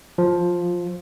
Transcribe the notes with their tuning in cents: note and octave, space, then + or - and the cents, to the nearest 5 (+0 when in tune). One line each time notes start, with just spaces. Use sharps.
F3 +10